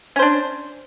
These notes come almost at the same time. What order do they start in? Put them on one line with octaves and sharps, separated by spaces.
C#4 C5 D4